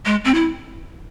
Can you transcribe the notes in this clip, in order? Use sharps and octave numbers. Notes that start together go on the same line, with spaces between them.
G#3
C4
E4